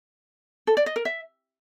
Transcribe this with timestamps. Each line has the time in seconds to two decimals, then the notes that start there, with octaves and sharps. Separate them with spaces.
0.67 A4
0.77 D5
0.86 D#5
0.96 A#4
1.05 E5